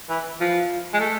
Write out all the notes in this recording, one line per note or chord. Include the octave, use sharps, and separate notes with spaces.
E3
F3
G#3
A3